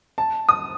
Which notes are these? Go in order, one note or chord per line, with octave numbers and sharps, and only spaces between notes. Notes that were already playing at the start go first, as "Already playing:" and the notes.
A5
D#6